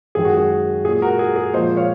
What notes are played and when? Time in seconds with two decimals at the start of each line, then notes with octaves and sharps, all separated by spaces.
0.15 F#2 D#3 G#3 G#4
0.25 F#4
0.34 G#4
0.85 A#2 G#3 G#4
1.02 F#4 A#4
1.19 G#4
1.36 G#4
1.53 A#2 F3 G#3 C5 D#5
1.77 C#5 F5